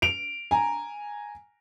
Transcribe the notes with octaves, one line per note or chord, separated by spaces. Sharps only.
D7 F7
G#5 A#5